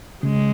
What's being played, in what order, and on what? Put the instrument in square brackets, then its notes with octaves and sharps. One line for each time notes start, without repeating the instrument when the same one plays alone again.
[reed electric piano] C#3 [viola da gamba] G#3